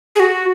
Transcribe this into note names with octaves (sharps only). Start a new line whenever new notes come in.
G#4
F#4